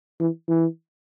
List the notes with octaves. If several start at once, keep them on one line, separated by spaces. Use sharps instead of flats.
E3
E3